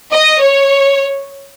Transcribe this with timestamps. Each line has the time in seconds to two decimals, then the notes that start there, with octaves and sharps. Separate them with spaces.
0.11 D#5
0.40 C#5